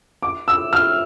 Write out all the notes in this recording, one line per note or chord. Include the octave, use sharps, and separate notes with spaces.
D6
E6
F6